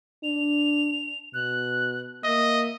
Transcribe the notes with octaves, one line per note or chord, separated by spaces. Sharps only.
D4 F7
B2 F#6
A#3 D#5 E5